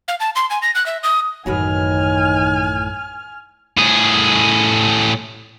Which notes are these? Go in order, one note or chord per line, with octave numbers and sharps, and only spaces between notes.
F5
A5
C6
G#5
A#6
F#6
E5
D#6
A1 F#2 A2 D#3 F#4 B4 G#5 F6
A2 G#4